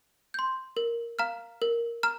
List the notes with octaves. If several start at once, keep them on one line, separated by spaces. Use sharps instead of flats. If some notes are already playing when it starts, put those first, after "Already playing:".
C6 G6
A#4
F5 A#5 F6
A#4
A#5 F6